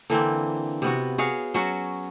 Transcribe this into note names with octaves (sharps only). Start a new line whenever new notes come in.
D3 E3 A#3 C4
C3 B3 F#4
F#4 G#4 C#5 F5
F#3 C#4 F#4